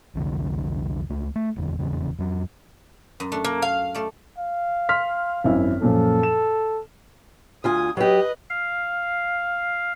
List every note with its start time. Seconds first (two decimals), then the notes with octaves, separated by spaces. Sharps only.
0.15 C2 F2 D3
1.09 C#2 A3
1.36 A3
1.56 D#1 G#1 E2 D3
1.79 F1 E2 C#3
2.19 F2 F#3
3.20 F#2
3.32 A3 D4
3.45 A#3
3.62 F5
3.94 A3 D5
4.38 F5
4.89 C6 F6 B6
5.44 G#1 F#2 E4
5.82 F#2 A#2 F3 A4
6.23 E7
7.64 D2 F4 G#5 D#6
7.97 F#3 G4 B4 D#5
8.50 F5